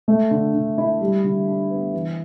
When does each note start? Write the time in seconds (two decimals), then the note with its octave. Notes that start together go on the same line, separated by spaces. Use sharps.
0.08 A3
0.31 D3
0.54 D3
0.78 E4
1.01 G3
1.24 D3
1.48 D4
1.71 B3
1.93 E3